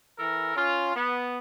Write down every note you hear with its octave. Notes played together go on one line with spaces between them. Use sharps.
E3 A4 A#4
C#4 F4
B3